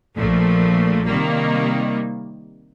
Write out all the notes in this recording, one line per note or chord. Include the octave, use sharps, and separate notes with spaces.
A#1 A#2 F3 A3
C3 D#3 G3 A#3